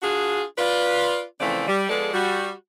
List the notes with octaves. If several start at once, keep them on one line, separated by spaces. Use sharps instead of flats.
D4 F4 F#4 G#4
F4 B4 D5
C#3 E3 F3 A3 C4 D5
G3
F3 G#3 B3 G#4 A4 D5
G3 F#4